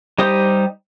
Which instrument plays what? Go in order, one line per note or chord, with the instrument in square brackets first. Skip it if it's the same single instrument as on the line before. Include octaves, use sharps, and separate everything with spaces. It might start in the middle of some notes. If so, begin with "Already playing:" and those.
[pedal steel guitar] G3 D#4 G4 C5 D#6